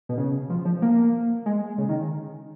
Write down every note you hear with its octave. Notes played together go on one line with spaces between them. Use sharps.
B2
C#3
F3
F3
A#3
G#3
C#3
D#3